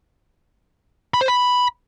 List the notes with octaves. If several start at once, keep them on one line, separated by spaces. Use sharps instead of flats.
B5
C5
B5